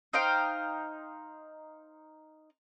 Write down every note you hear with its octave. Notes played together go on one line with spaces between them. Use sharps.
D#4 C5 F5 G5